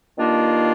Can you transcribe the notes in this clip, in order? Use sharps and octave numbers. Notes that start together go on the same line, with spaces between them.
G2 D#3 A#3 D4 F4